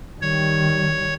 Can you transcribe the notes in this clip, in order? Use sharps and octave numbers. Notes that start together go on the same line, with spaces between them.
D#3 G3 C#5